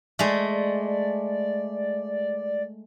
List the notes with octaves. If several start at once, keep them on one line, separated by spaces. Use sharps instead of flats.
G#3 A3 D5